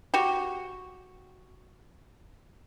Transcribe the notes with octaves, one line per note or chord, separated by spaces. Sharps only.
F#4 G4